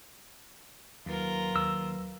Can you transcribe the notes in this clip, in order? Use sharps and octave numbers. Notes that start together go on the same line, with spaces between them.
D#2 F#3 F4 A#4 B4
D#2 E6